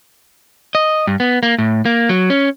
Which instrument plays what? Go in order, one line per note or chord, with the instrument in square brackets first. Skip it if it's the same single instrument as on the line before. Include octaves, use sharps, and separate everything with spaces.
[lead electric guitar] D#5
G2
B3
A#3
A2
A#3
F#3
C#4